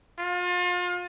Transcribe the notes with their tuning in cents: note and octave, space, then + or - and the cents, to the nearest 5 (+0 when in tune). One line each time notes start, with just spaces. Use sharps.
F4 +35